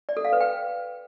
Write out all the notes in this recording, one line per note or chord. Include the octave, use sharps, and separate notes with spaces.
D5
A4
F5
B4
G5